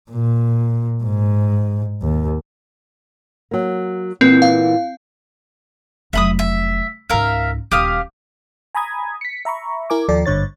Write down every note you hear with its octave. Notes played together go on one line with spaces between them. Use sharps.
A#2
G#2
D#2
F#3 A#3
A#2 E3 B3 C4
F5
F1 F#3 E5 B5 D#6
E5
C#2 G#2 A#4 E5 F5
D#1 G4 F5 D#6
G#5 A#5 B5 D#6 G#6
B6 C#7
E5 A#5 B5 C#6
E4 A#4 G#5 D6
D#2 F3 A4 D5
G#1 G2 D3 C#5 A6